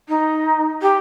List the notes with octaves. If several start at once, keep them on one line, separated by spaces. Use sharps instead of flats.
D#4
G4